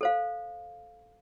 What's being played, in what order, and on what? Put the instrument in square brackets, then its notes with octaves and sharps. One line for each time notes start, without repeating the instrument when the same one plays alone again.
[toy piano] A4 C5 F5